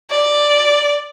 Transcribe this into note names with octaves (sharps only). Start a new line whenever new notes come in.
D5